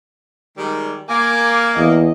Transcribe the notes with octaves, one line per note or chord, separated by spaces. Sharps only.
D#3 G3 G#3
A#3 G#5 D6
E2 D#5